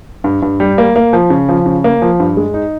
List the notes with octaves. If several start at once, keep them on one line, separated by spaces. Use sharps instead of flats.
G2
G2
G3
A#3
A#3
F3
C#3
F3
C#3
A#3
F3
G2
G#3
D#4